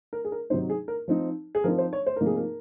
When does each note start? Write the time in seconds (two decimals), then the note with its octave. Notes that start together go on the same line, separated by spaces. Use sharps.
0.13 A#4
0.25 G#4
0.32 A#4
0.50 C3 F#3 C4 D#4 C5
0.70 G#4
0.88 A#4
1.08 F3 C4 D#4
1.55 G#4
1.64 F3 C4 D#4 A#4
1.78 C5
1.93 C#5
2.06 C5
2.16 C3 F3 A#3 D#4 A#4
2.26 G#4
2.36 A#4